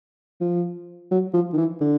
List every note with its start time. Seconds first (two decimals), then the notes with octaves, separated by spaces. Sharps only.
0.41 F3
1.11 F#3
1.34 F3
1.53 D#3
1.58 E3
1.81 D3